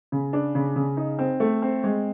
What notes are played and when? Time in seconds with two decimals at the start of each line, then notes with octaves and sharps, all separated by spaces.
0.12 C#3
0.33 D4
0.55 C#3
0.76 C#3
0.97 D#4
1.19 C4
1.40 A3
1.62 C4
1.84 G#3